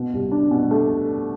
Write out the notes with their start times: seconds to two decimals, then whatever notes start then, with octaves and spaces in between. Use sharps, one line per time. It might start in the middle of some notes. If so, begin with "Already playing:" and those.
Already playing: B2
0.14 C2
0.32 D4
0.51 B2
0.71 A3